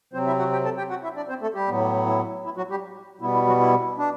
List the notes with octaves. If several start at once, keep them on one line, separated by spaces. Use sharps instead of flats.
C3 F#3 C4 C5
E4 E5
F#4 F#5
G4 G5
A4 A5
G4 G5
F#4 F#5
E4 E5
D4 D5
C4 C5
A3 A4
G3 G4
A2 F#3 B3
E4
E4
F#3 F#4
G3 G4
B2 G3 B3 E4
E4
F#3 F#4
E4
D4